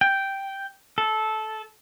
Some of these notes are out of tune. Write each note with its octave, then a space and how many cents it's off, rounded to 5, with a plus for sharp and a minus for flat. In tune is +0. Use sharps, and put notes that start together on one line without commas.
G5 -5
A4 -15